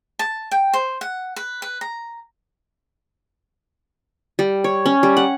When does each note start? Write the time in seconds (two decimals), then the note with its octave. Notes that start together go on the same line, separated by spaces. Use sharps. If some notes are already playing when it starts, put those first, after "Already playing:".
0.19 A5
0.51 G5
0.74 C5
1.01 F#5
1.36 B4
1.62 B4
1.81 A#5
4.39 G3
4.64 C#5
4.86 C#4
5.03 G3
5.17 F#5